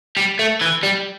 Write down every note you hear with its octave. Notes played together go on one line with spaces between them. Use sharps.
G3
A3
E3
G3